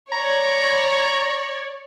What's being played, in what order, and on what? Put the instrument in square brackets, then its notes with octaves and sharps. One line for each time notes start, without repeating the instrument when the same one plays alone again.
[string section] C#5 D5 [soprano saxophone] A#5